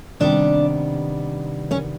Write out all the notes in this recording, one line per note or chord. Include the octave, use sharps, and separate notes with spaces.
C3 D#3 G3 B3 D4 D5
C#4 C#5